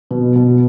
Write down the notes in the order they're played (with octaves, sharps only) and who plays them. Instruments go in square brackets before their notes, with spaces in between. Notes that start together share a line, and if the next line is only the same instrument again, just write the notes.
[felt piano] B2
B2